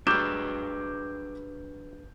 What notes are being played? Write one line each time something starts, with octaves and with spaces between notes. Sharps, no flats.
F#3 G3 D4 G#4 B4 D6 G6 E7